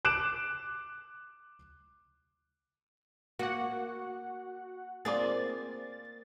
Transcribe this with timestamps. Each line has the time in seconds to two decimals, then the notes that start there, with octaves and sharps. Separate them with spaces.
0.05 D6 F#6 D7 E7
3.39 A#3 F#4 F#5
5.05 A#3 C4 F4 G#4 D5 A6